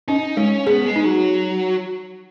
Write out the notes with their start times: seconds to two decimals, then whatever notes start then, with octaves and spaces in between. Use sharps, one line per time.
0.08 C#4 D#4
0.37 G#3 C#4
0.67 B3 G#4
0.86 G#3
0.96 D#4
1.05 F#3